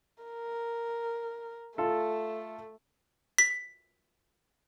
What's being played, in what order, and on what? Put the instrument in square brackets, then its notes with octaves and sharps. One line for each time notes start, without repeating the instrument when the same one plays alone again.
[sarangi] A#4
[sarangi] A3 [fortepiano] F4 A4
[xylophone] B6